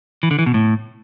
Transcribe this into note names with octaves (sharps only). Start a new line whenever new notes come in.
E3
D3
E3
B2
A2